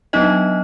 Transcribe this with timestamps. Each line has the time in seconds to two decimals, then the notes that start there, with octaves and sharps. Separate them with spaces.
0.13 F#3 B3 D4 D#4 D#5